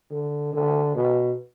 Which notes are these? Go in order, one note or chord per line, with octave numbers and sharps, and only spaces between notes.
D3
D3
B2